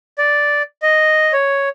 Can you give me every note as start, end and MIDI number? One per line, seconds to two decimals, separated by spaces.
0.18 0.62 74
0.82 1.32 75
1.33 1.69 73